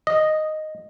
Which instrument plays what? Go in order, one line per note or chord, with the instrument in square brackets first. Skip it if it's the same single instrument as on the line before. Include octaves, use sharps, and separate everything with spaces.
[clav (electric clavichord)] D#5